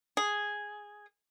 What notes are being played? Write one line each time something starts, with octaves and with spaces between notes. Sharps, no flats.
G#4